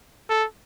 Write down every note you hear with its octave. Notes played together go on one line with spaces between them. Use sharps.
A4